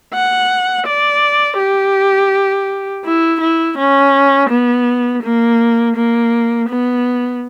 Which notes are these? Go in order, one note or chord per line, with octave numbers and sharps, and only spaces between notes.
F#5
D5
G4
E4
E4
C#4
B3
A#3
A#3
B3